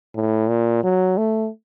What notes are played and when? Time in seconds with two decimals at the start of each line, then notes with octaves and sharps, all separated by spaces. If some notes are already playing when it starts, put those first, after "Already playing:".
0.15 A2
0.49 A#2
0.84 F#3
1.17 A3